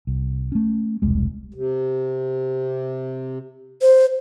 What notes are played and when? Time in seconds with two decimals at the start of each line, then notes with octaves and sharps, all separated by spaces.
0.07 C2
0.52 A3 C#4
1.02 E1 C2 G3 G#3
1.54 C3
3.82 C5